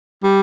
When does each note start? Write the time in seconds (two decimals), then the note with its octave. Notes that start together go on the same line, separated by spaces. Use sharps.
0.24 G3